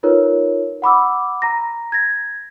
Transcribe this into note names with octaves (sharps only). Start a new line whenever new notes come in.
D#4 F4 A#4 B4 C#5
F#5 B5 D6 E6
A#5 A#6
G#6 A#6